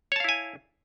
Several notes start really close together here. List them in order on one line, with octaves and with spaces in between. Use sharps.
C#5 A5 F5 E4 G#5